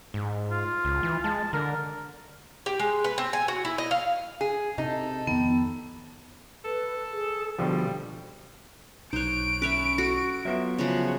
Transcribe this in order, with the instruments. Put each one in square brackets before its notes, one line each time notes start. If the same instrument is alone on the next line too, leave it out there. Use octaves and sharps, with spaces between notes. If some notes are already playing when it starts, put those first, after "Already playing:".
[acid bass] G#2
[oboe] F4
[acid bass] C#2
E3
[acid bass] G#3 [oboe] A5
[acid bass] D3 [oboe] A#4
[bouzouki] G4
G#3
B4
C4
G#5
F#4
E4
D#5
F5
[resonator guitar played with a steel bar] G#4
[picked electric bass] C3 [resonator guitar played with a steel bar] D#4 [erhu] A4
[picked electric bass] F2 D#3 [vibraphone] B3
[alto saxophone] A4 [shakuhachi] B4
[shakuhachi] G#4
[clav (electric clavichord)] B2 D3 F3 [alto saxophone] G3 [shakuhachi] G5
[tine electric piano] B1 [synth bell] D#4 F#6 [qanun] C5 C#5 [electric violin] D7
[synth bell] C#4 [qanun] B4 C#5 E5
[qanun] F#4 [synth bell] A4
[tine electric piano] F#3 B3 F4 [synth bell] E5
[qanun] C#3 F3 G#3 [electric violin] F#4